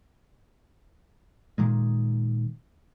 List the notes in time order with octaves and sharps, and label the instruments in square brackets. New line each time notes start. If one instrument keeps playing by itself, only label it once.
[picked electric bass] A#2 D#3 G#3